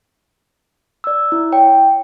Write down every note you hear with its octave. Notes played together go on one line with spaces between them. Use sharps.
D5 E6
E4
C#5 G5